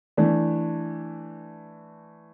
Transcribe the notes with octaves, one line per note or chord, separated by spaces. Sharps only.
E3 A3 D4